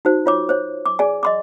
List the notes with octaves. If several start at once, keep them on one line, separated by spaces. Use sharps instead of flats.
D#4 F#4 C5
F4 C#5 D6
C5 C#5
D6
G#4 D5 G#5
D#5 C6 D6